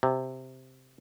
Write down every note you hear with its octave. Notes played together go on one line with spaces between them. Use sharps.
C3